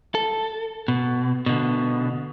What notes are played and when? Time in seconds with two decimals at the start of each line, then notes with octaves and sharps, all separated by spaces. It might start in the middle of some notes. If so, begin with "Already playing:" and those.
0.15 A4
0.88 B2
1.46 B2 D3